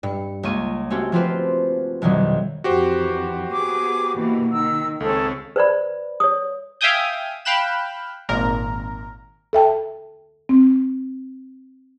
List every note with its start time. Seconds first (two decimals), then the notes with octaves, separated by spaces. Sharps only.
0.03 G2 C#7
0.43 C#2 A#3 C#6 D#7
0.90 A3 C4 C#4 F#4 G4
1.12 F3 C4 F4 G4 B4 C5
2.02 C2 F2 B2 D#3 F#3 G3
2.64 F2 E3 F#4 G4 C5
3.51 B3 G#4 D6
4.15 B2 E3 A#3
4.52 D#3 E6
5.00 C#2 C4 G#4 A4 C#5
5.56 B4 C5 D5 B5
6.20 C#5 D#6
6.81 E5 F5 G5 G#5 D#6 G6
7.45 F5 G5 B5 F#6 E7
8.29 G#1 A#2 A#4
9.53 A4 E5 G5 A5
10.49 C4